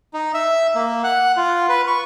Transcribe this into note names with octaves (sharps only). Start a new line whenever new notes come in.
D#4
E5
A#3
F#5
F4
B4
C#6